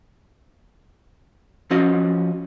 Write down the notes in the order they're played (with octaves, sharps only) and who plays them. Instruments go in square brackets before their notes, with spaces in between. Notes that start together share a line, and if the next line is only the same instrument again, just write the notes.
[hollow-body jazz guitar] F3 C#4 F#4 D#5